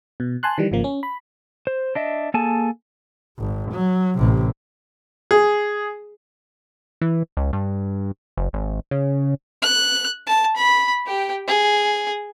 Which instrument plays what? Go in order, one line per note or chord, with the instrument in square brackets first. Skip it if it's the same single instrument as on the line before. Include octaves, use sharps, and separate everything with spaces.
[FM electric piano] B2
G#5 A5 C6 F#6
D#3 E3 G3
G#1 C#3 F3 A#3
C#4
B5
[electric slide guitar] C5
D4 D#5 E5
A#3 G#4 A4 G#5 A5
[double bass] G#1
F#3
A1 C3
[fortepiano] G#4
[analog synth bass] E3
C#2
G2
F#1
G#1
C#3
[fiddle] F#6
A5
B5
G4 G5
G#4